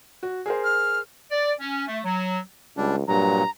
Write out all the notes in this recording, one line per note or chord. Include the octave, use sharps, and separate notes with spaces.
F#4
G#4 A#4 C5
F6
D5
C#4
A3
F#3
C#2 G3 D4
G2 A#2 F#3 A#5